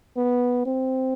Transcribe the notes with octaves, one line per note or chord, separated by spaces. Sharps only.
B3
C4